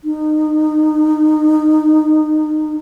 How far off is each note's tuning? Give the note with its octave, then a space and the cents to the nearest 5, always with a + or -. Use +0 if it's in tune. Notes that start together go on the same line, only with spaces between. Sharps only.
D#4 -25